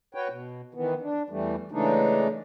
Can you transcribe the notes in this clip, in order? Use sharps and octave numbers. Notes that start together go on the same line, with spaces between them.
F#4 B4 C#5 G5
B2
D#3 E3 B3
D4
E2 E3 G3 A3
C#3 E3 G#3 A3 D4 D#4